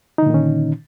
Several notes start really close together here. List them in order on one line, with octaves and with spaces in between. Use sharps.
D#4 D3 A#2 D#3 C#4